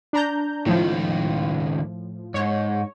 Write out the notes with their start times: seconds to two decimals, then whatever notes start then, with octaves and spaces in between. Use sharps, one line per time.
0.13 D4 A#5 G6
0.66 C#2 A2 D#3 F3
2.34 G#2 C#5